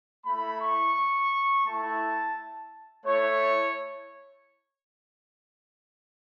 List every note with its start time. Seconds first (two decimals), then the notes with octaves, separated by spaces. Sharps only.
0.25 A3 E4 B5
0.60 C#6
1.65 A3 E4 A5
3.05 A3 E4 C#5